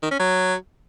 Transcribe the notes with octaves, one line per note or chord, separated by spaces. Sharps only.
D#3
C#4
F#3